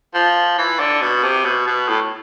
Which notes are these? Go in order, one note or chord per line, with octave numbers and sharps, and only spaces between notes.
F3
E3
D3
B2
C3
B2
B2
A2